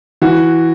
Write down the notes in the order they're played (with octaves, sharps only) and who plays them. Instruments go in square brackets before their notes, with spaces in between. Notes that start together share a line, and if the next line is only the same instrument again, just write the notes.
[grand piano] E3 F#4